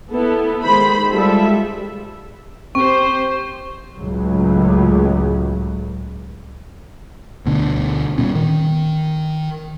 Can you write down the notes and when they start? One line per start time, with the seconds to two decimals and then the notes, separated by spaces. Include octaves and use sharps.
0.11 B3 E4 A4
0.64 D#3 G#3 C5 B5
1.11 G3 G#3 F4 A4 E5
2.75 C4 G4 C5 C#6
3.99 C#2 A2 F#3
7.46 D2 B2 D3
8.18 A#2 G3 B3 C#4
8.35 D#3